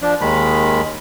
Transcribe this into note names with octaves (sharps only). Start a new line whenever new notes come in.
F3 D4
D#2 D#3 G#3 B5